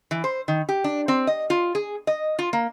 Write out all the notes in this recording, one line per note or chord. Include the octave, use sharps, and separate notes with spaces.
E3
C5
D#3
G4
D4
C4
D#5
F4
G#4
D#5
F4
A#3